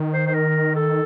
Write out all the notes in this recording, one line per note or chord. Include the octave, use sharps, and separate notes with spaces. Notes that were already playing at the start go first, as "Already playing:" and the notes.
Already playing: D#3
C5
C5
A#4
A4